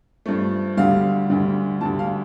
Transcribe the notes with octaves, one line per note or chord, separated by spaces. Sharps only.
G2 F3 A3
D2 D3 G3 F5
D2 D3 G3
D2 D3 G3 A5
F5